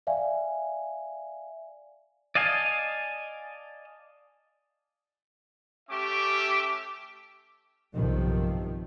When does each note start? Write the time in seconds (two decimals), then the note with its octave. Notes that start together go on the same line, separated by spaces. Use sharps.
0.07 D5 E5 F5 G#5
2.35 D5 D#5 F5 G#5 A5
5.89 A3 C#4 G4 E5 D6
7.93 B1 G2 C3 D#3 F3